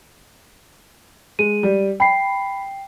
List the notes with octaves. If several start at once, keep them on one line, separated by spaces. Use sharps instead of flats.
G#3 D#7
G3
G5 B5 C7